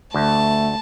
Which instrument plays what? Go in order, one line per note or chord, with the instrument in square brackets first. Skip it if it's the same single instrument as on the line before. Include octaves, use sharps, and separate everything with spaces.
[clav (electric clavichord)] D2 [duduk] A3 [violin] A5